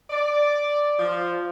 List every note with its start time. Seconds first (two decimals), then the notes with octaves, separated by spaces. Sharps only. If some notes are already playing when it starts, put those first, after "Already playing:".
0.10 D5
0.98 F3